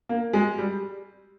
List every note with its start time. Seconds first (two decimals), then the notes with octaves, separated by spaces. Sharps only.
0.09 A#3
0.33 G#3
0.58 G3